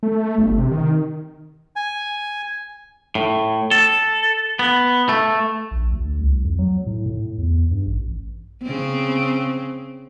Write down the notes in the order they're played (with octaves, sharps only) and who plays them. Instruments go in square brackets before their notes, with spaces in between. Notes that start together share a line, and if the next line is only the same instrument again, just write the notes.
[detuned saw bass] A3
G1
C3
D#3
[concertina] G#5
[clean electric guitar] A2
A4
B3
A3
[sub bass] A#1
D2
C2
F2
F#3
A2
A2
E2
G2
A1
[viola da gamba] C#3 C4